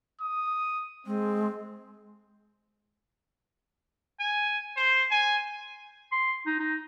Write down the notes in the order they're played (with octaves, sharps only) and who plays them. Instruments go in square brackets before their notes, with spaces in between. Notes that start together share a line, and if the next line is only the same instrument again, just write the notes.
[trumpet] D#6
[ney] G#3 [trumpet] C4
[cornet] G#5
C5
G#5
[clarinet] C6
D#4
D#4